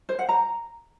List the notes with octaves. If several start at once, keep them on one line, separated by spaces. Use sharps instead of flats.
C5
F#5
A#5